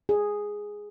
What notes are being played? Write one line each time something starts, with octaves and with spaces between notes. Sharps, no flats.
G#4